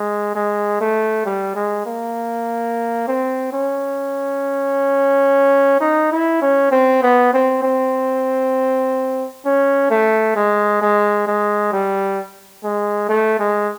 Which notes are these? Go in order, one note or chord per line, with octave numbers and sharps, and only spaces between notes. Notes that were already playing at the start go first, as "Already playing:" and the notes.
Already playing: G#3
G#3
A3
G3
G#3
A#3
C4
C#4
D#4
E4
C#4
C4
B3
C4
C4
C#4
A3
G#3
G#3
G#3
G3
G#3
A3
G#3